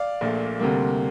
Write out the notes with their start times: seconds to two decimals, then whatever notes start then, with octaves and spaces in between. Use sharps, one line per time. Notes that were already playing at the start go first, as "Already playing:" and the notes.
Already playing: D5 F5
0.21 A#1 A#2 A3
0.59 D2 C3 G3 A#3